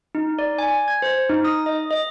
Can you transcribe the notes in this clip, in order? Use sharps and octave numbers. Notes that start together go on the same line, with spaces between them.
D#4
D5
G#5
G#6
C5
D#4
D#6
D#5
D#5